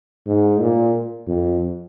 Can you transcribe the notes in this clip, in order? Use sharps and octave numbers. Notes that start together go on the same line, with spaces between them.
G#2
A#2
F2